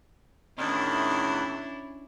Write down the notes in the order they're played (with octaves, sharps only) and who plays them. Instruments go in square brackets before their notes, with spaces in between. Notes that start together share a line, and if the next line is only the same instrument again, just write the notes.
[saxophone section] E2 A2 D#3 [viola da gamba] C#4 D4 E4